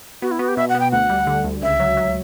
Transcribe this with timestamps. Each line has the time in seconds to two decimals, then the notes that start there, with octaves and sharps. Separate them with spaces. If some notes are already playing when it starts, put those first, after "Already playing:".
0.22 B3 F#4
0.31 E4
0.39 B3 F#4
0.48 G4
0.57 B2 E5
0.69 F#5
0.75 B3 G5
0.91 D2 F#5
1.10 G3
1.27 D3
1.44 D2
1.62 C#2 E5
1.80 F#3
1.97 F#3